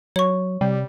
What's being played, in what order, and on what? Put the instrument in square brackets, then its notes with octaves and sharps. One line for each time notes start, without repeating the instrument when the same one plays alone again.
[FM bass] F#3 [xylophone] C#5 C#6
[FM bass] C3 [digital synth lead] G3